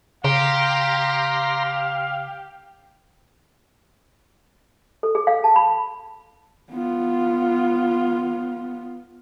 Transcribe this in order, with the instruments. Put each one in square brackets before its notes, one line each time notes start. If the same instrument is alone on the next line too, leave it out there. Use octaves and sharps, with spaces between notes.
[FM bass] C#3 [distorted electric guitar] G4 [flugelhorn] F5 [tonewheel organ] A#5 C6
[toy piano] A4
G#4
F5
A5
B5
[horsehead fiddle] B3 F4